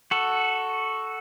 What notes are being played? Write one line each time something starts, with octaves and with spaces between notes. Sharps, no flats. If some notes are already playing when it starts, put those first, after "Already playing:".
F#4 A4